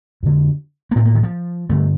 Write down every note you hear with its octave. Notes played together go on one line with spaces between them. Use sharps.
F2 D3
A#3
A2 C4
A#3
D#3
F3
G2 D3 A3